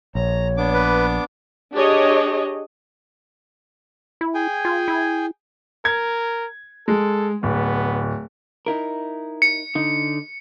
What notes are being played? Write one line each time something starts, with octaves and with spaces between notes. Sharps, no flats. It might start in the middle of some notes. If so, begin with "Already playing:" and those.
A#1 C#5 A#5
B3 D4 D6
B4
D4 G4 G#4 C#5 D#5
E4
G#4 G5 G#5
F4
E4
A#4 G#6
G#3 A4
D1 B3
D#4 E4 A#4
C#7
D3 D#4